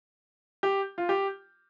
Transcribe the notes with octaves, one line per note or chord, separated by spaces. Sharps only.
G4
F4
G4